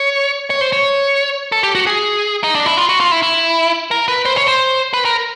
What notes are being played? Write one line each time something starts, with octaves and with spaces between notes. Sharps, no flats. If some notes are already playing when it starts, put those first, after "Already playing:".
Already playing: C#5
C#5
C5
C#5
A4
G4
F#4
G#4
D#4
D4
E4
F4
F#4
F4
E4
E4
A#4
B4
C5
C#5
C5
B4
A#4